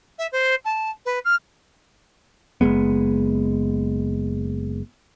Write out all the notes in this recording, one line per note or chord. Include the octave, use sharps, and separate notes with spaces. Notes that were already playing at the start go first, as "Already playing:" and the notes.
E5
C5
A5
B4
F6
F#1 D#2 G#3 B3